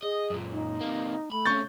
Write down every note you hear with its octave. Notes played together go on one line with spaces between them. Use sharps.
G#4 D#5
F#2 A#2
D#4
C3 A#3
A3 B5
C3 C#4 C#6 G6 A6